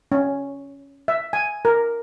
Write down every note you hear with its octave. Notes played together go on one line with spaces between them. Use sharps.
C#4
E5
G#5
A#4